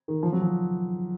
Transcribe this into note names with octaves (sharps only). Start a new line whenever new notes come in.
D#3
F3
F#3
F3